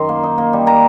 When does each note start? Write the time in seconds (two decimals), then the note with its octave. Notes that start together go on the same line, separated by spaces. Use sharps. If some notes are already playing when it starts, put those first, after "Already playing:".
Already playing: F#2 D#3 A#5 C6
0.09 A#3
0.23 D#4
0.38 A#3
0.53 G3
0.67 A#3 A#5